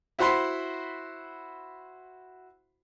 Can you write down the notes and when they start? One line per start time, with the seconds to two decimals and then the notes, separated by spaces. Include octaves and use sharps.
0.19 E4 F#4 C5 F#5 B5 C6